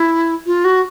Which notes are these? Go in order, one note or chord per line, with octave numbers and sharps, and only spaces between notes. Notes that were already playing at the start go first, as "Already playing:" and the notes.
Already playing: E4
F4
F#4